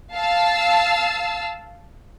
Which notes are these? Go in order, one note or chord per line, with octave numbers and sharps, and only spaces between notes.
F5 A5 E6